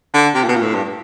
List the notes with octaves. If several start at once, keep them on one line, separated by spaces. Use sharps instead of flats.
D3
C3
A#2
B2
A#2
A2
G2